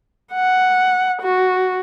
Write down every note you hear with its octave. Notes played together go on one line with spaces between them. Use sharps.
F#5
F#4